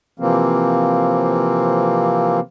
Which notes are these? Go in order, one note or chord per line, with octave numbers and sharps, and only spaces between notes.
C3 E3 F3 A#3 C4